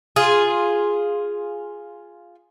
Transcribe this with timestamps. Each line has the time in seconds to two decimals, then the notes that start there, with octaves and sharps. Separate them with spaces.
0.16 F4 G#4